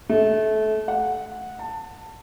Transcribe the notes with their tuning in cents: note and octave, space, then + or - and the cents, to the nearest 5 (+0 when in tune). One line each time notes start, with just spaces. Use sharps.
A3 -25
F#5 -10
A5 +20